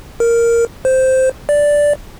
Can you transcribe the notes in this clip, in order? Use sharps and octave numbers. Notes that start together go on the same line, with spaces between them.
A#4
C5
D5